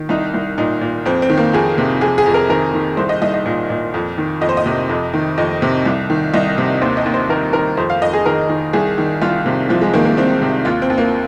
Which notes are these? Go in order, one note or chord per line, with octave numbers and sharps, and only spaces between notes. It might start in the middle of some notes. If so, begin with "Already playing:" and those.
Already playing: D#3
C2 D#4
C2
A#2 D#4
A#2
F2 C4
C4
D#3
A#3
F2 G#4
C3
F2 G#4
G#4
F2
A#4
D#3 A#4
D#3
C2 C5
D#5
C2 D#5
D#5
A#2
A#2
F2
D#3
F2 D#5
C5
D#5
C3
F2
D#3
F2 D#5
C3
C2
D#3
C2 D#5
C3
D#2 C5
D#5
D#2
C5
D#3 A#4
D#3 A#4
F2 C5
F5
F2 D#5
G#4
D#3 A#4
D#3
C2 G#4
D#3
C2 F4
C3
C2 F3
G#3
D#3 A#3
A#3
C2 C4
C3
D#2 F4
C4
D#2
A#3